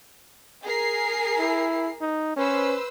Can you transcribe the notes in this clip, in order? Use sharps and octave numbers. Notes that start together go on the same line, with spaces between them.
G#4 A#4 C7
E4
D#4
C#4 B4 C5 E6